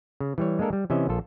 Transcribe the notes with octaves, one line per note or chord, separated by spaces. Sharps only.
C#3
E3 G3 C#5
G#3 A#3 D4 A4 A#4
G3
C3 E3 C#4 D#5 E5
A#1 F4 A4